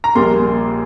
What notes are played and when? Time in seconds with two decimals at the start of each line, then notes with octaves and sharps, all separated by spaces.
0.04 A#5
0.15 A#1 A#2 G3 A#3 C6